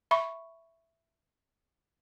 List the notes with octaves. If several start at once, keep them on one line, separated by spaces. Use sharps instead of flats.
E5 B5 C#6